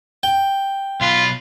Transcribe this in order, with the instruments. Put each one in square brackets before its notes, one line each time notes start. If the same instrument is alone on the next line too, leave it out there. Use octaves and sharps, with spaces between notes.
[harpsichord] G5
[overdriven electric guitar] B1 B4 [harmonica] F4